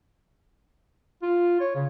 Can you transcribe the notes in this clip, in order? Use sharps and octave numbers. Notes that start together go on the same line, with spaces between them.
F4
C#5
C#3